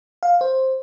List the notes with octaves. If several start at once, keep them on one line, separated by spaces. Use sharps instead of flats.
F5
C5